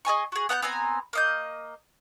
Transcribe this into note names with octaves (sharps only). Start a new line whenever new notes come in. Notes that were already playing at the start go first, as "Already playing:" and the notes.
G#4 D#5 G#5 C#6
F#4 G#4
B3 F#5 G#5 G6
B3 C4 G#5 A#5
A#3 D#5 G6